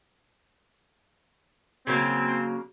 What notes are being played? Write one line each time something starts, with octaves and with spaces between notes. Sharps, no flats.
C#3 F#3 A#3 C4